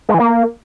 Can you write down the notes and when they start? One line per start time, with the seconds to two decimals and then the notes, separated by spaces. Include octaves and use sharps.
0.09 G#3
0.14 E3
0.20 A#3